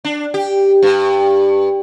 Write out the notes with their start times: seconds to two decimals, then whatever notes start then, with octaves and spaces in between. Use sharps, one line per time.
0.05 D4
0.34 G4
0.83 G2